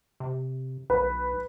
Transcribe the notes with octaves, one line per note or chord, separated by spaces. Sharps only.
C3
B1 B4